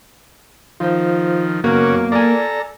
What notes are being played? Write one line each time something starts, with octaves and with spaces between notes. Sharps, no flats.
D#3 F3 F4 C5
F#2 C#3 F#3 A#3 B3 C#4 F#4
A4 D5 G#5 A#5